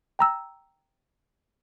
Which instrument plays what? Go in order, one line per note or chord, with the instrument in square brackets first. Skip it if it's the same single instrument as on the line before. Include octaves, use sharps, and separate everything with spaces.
[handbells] G5 A#5 E6